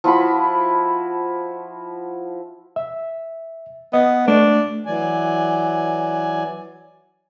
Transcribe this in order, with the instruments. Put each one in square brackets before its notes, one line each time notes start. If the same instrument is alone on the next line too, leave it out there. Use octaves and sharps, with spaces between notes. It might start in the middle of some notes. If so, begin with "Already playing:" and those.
[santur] F3 E4 F#4 B5
[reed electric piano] E5
[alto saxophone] B3 [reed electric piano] D#5
[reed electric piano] A3 [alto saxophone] D4
[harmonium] E3 F#3 D5 G#5